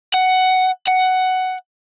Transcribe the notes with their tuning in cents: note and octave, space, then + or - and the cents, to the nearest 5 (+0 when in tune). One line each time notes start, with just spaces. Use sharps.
F#5 +10
F#5 +10